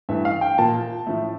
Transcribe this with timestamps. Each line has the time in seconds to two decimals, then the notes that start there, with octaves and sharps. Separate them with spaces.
0.09 G2 E3 A3 E5
0.25 F5
0.41 G5
0.58 A#2 F3 A#3 A5
1.07 A2 F3 A3